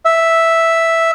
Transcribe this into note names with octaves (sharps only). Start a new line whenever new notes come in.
E5